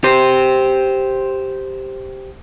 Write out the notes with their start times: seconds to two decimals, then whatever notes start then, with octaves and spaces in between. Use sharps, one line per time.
0.04 G4 C5